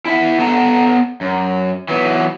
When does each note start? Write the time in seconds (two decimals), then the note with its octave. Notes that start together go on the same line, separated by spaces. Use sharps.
0.06 E4 E5 F#5
0.39 B3 A4 F#5 A5 A#5
1.21 F#2
1.89 E3 F#3 B3